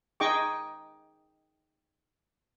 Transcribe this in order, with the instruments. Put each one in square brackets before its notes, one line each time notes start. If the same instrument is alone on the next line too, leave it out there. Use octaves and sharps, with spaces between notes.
[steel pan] D#4 G#4 D#5 G5 C#6 D6